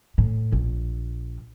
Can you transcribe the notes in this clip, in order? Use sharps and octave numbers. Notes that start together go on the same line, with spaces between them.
A2
A#1